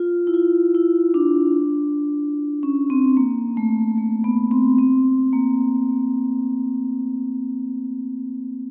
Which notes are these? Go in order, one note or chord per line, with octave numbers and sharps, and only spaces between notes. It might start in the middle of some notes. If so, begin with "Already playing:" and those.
Already playing: F4
E4
F4
E4
D4
C#4
C4
A#3
A3
A#3
B3
C4
C4
A#3